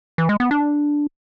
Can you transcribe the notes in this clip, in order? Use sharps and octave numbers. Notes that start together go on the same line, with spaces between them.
E3
G#3
B3
D4